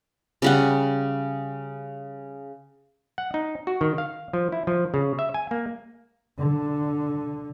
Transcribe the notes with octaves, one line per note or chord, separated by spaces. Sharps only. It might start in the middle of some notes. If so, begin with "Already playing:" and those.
C#3 G3 F#5
F#5
D#4
F#4
D#3
F5
F3
E4
F3
C#3
E5
G#5
A#3
D3